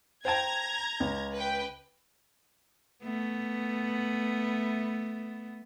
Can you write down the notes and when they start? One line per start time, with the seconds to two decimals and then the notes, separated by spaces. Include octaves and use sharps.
0.25 C5 G5 A5 A#5 G#6
1.00 C#2
1.34 B4 G5
3.03 A3 B3